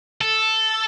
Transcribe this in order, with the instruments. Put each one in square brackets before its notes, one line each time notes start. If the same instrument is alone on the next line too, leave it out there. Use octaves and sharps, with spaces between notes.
[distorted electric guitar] A4